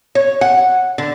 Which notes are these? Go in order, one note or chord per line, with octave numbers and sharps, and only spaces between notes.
C#5
F#5
D3